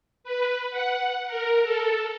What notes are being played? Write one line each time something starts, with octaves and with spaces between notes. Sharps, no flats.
B4
F#5
A#4
A4